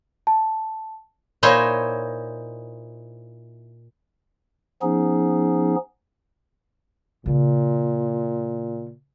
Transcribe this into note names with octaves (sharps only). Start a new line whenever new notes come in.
A5
A#2 D#4 E4 C5 C#5
F3 B3 C#4 D#4 G#4
A#2 C#3 D4